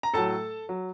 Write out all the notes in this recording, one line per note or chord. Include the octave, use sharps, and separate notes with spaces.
A#5
A2 F#3 A4 A5
F#3